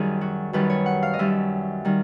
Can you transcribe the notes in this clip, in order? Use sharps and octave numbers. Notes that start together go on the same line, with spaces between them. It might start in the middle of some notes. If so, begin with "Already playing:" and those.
Already playing: F#2 D#3 G3 G#4
F#4
F#2 D#3 G3 B4
C#5
F#5
F5
D#5
F#2 D#3 G3 E5
D#3 G3